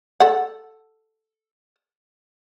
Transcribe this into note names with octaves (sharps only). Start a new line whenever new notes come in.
A4 F#5